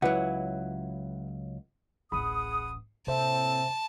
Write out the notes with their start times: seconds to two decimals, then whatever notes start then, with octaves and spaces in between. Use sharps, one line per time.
0.02 C#2 F#3 E4 B4 F#5
2.12 D1 A1 G#4 F#5 B5 D#6
3.07 A2 C3 A#3 C4 C5 E5 A5